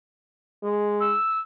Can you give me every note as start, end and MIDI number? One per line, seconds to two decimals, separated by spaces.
0.63 1.14 56
1.00 1.39 88